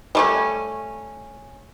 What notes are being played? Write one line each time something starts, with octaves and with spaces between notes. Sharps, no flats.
G3 A3 C#4